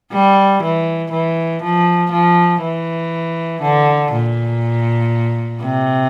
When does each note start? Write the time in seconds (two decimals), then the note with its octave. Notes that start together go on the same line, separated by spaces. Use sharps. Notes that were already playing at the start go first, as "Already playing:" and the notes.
0.12 G3
0.62 E3
1.11 E3
1.62 F3
2.11 F3
2.62 E3
3.62 D3
4.12 A#2
5.62 C3